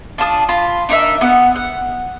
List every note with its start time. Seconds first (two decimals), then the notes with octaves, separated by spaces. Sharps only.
0.18 D4 F4 A5 D#6
0.49 F4 B5
0.89 D4 D#4 A#4 E5
1.21 B3 F#5
1.56 F#5